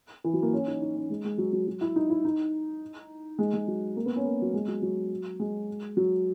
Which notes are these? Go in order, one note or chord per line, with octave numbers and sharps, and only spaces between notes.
E3
F#3
A#3
C#4
D#4
D#4
C#4
G#3
G#3
F#3
F#3
F#3
E4
D#4
E4
D#4
G#3
G#3
F#3
A#3
B3
C#4
A#3
F#3
G#3
F#3
F#3
G#3
F#3